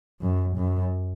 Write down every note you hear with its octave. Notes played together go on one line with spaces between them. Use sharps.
F#2
F#2